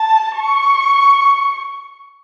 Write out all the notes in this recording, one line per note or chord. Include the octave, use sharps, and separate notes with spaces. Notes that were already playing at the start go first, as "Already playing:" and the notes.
Already playing: A5
C#6